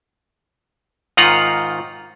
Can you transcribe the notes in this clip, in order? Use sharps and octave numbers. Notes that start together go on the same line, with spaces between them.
G#2 D#3 F4 D#5 F#5 A#5